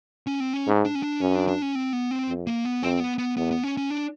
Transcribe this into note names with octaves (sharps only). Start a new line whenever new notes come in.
C#4
C4
C#4
G#2
D4
C#4
D4
F#2 C#4
D4
D4
C#4
C4
B3
C4
F2
A#3
B3
F2 C4
B3
B3
E2 B3
B3
C#4
C#4
D4